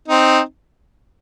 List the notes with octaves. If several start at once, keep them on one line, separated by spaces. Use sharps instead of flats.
C4 D#4